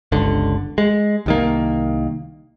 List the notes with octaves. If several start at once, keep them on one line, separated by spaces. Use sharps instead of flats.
G1 C#2 D3
G#3
C2 D#3 A#3